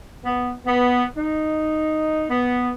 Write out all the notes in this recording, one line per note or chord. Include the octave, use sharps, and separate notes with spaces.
B3
B3
D#4
B3